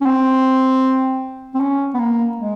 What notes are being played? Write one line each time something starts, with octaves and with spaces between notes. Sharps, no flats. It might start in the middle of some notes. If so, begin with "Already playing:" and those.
C#4
C4
C4
C#4
B3
A#3
G#3